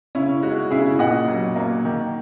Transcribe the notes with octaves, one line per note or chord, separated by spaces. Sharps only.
C#3 C#4 E4
G#3 D#4 F#4
C#3 E4 G#4
A#2 D#5 F#5
F#3
A#3
D#3